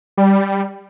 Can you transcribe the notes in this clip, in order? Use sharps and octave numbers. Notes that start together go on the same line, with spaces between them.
G3